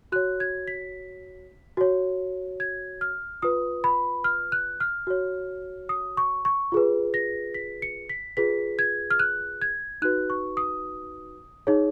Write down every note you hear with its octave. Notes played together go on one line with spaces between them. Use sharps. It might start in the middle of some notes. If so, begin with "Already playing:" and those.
F#4 C#5 F#6
G#6
B6
F#4 C#5
G#6
F6
F4 B4 D#6
B5
F6
F#6
F6
F#4 C#5
D#6
C#6
C#6
F4 G#4 B4
A#6
B6
C#7
B6
F4 G#4 B4 B6
G#6
F6
F#6
G#6
D#4 F#4 B4 F#6
C#6
D#6
D#4 G#4 C#5